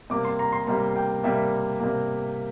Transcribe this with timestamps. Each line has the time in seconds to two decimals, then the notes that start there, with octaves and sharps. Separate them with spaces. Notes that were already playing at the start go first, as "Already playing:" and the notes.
0.10 C3 G3 A#3 D6
0.25 C6
0.39 A#5
0.52 C6
0.67 C3 G3 A#3 A#5
0.96 G5
1.23 C3 G3 A#3 E5
1.80 C3 G3 A#3